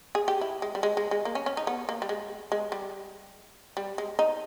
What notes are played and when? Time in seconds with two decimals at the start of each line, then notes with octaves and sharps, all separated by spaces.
0.15 G#4
0.28 G4
0.41 E4
0.62 G#3
0.75 G3
0.83 G#3
0.97 G#3
1.11 G#3
1.25 A#3
1.35 C#4
1.46 C#4
1.57 D#4
1.67 B3
1.89 A#3
2.02 G3
2.09 G#3
2.52 G#3
2.72 G3
3.77 G3
3.98 G#3
4.19 D#4